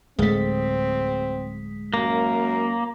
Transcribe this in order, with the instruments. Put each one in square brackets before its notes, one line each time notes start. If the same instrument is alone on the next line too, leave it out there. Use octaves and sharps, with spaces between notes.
[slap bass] D1 A3 [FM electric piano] G#3 B6 [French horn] C4
[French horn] F#2 [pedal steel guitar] A#3